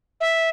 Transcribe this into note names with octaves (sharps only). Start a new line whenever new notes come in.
E5